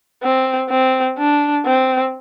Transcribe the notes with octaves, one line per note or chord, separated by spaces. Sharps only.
C4
C4
D4
C4